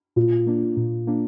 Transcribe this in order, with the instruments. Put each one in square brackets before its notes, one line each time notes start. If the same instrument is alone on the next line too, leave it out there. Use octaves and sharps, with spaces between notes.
[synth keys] A#2 [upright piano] F4
[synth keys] A#3 D4
A#2
A#3 D4